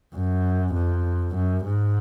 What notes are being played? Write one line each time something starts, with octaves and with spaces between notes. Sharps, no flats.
F#2
F2
F#2
G#2